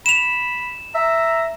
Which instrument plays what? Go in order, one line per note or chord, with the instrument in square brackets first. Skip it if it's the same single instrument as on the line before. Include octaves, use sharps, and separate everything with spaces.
[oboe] B5 [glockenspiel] E7 F7
[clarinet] E5 [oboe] A#5